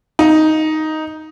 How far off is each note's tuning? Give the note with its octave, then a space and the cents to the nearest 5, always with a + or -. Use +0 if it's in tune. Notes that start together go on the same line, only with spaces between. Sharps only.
D#4 +5